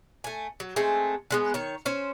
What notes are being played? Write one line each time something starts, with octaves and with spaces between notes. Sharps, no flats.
A3 G#5
F#3
G#3 A3 C4
D3 G#3 B3
D#3 C#5
C#4 C5